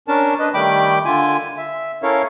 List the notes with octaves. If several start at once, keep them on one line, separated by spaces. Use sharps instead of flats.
C#4 D4 A#4 A5
D4 B4 D#5
D#3 G3 A3 G5 B5 D6
D3 F4 G#5
E5
C#4 E4 A4 A#4 C#5 F5